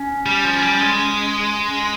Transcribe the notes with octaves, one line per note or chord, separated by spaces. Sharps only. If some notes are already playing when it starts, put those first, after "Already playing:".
Already playing: C#4
G3
F3
G3
G#3
C#4